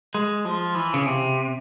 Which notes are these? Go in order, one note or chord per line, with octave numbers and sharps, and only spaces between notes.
G#3
F3
E3
C#3
C3